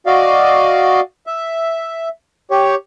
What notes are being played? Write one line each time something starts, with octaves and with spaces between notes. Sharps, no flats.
F#4 D5 D#5 F5
E5
G4 C#5